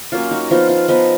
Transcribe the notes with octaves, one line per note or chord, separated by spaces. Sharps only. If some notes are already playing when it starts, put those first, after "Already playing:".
F#3 A#3 C#4 F4
D#4 F#4
F3 B3 D#4 F4
F4
F3 B3 D#4 B4 D#5